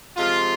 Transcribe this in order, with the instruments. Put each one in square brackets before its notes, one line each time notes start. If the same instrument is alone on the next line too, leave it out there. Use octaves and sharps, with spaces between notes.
[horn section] C3 F3 G#3 F4